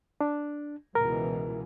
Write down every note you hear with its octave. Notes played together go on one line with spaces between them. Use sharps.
D4
C#2 B2 E3 A#4